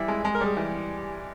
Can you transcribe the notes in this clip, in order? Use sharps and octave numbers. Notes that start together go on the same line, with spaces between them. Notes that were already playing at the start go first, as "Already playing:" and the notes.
Already playing: E3 G3 E4
G#3
G#3 G#4
A#4
G3
G#4
E3 G4